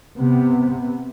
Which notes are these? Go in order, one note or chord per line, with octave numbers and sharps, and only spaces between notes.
C3 B3